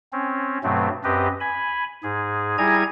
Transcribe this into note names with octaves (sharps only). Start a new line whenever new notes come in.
C4 C#4
G2 B2 F#3 A3 C4
F#2 C4 G4 B4 D#5
G#5 B5
G#2 G#4
G3 E4 G#4 G#5 A#5 G#6